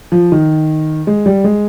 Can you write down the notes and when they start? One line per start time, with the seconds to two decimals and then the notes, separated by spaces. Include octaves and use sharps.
0.12 F3
0.32 D#3
1.07 G#3
1.26 G3
1.44 G#3